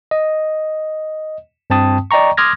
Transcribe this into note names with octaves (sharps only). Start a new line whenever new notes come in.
D#5
G2 C4 G5 A5 D#6
D5 D#5 G5 A#5 C#6
C6 D6 D#6 F6 G#6 A#6